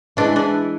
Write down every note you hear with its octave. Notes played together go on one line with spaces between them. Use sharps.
E3 G#3 D4
D4